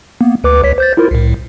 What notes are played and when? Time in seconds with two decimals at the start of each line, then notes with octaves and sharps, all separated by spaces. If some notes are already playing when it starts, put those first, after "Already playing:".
0.21 A#3 B3
0.44 D2 B4 D6
0.63 C#2 C#5 B6
0.78 C5 G6 A6
0.97 E4 F4 A#4
1.11 C2 A2